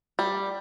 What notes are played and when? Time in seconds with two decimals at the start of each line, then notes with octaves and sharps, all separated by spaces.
0.19 G3